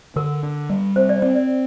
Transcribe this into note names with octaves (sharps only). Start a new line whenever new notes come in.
D3 A#4
D4
G3
C4 C5
D5
C4 D5
D5